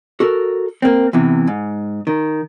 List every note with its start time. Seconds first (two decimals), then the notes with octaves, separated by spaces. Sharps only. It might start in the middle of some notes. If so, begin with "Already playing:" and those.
0.20 F#4 A4 A#4
0.82 A#3 C4
1.13 E2 C3 E3
1.47 G#2
2.07 D#3